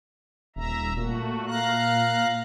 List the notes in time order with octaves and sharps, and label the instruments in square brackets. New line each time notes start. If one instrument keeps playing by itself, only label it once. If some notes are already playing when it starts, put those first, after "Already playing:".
[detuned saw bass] D#1 [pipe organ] E5 A#5
[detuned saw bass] A#2 [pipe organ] A3 F#4
[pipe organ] F5 A#5 F#6